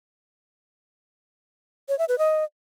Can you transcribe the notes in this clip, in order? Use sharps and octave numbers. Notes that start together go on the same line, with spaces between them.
C#5
E5
B4
D#5